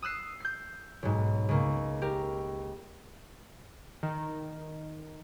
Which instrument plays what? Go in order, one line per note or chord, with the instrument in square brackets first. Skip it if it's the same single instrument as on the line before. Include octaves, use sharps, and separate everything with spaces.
[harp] D#6 E6 F#6 C7
G6 C7
B1 G#2
C#2 A#3
G4 A#4
[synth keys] D#3